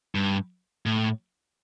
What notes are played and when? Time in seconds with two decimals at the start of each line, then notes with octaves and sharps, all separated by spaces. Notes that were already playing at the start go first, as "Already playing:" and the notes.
0.15 G2
0.86 A2